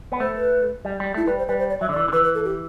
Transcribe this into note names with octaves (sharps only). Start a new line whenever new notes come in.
B3
A3 C5
B4
G3
G3
A3 E4
G3 B4
C5
G3 B4
C5
D5
F#3 E5
D3
D5
E3
D3
E3 B4
B4
A4
G4